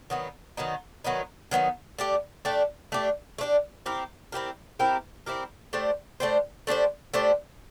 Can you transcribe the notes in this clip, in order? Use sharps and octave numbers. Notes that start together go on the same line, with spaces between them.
D#3 F#3 B3 D#4
D#3 F#3 B3 D#4
D#3 F#3 B3 D#4
D#3 F#3 B3 D#4
A3 D4 G4
A3 D4 G4
A3 D4 G4
A3 D4 G4
C4 E4 G4 A#4
C4 E4 G4 A#4
C4 E4 G4 A#4
C4 E4 G4 A#4
A3 D4 G4 C5
A3 D4 G4 C5
A3 D4 G4 C5
A3 D4 G4 C5